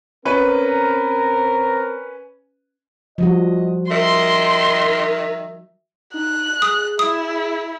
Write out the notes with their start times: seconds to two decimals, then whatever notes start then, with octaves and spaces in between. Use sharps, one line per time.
0.25 C4 C#4 A#4 B4
3.18 F3 G3 F#4 D#5
3.91 D#3 E5 C6
6.14 D#4 F#6
6.62 G#4 D#6
6.99 E4 D#6